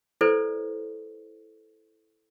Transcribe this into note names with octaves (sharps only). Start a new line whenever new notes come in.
E4 A4 B4 C5 D5